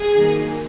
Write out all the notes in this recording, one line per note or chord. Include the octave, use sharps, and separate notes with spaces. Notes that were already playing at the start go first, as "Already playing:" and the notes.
Already playing: G#4
D#3 F#3 A#3 D#4